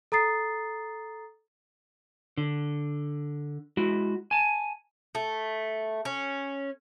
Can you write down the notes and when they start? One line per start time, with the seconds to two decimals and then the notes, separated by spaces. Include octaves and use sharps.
0.12 A4 A#5 D#6 A6 C7
2.37 D3
3.77 G#3 E4 F#4
4.31 G#5 A5
5.15 A3
6.05 C#4